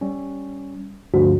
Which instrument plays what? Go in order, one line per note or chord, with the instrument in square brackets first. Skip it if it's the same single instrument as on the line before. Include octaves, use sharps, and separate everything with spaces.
[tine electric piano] G3 C#4
[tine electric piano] D2 G2 F3 [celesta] F#4